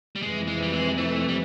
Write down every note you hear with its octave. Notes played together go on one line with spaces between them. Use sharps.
G3
F2 C3 E3 G#3
G#3
G3
G#3
A3
G3